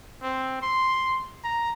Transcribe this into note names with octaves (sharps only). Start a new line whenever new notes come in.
C4
C6
A#5